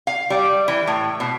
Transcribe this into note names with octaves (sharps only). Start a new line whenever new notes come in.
F5
G3
E3
A2
B2